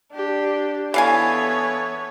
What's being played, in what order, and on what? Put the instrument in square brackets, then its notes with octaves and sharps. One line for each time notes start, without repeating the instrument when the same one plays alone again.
[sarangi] D4 [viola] G4
[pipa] E3 F5 G#5 [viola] B3 C#5 [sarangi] A4